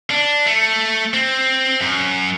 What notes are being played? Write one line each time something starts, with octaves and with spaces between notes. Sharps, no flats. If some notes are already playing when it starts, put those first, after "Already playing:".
D4
A3
C4
F#2